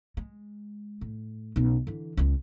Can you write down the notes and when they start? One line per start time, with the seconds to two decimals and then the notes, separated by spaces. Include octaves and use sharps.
0.17 G#3
1.01 A2
1.56 B1 C#3
1.87 D3 E3
2.17 C#2 G#3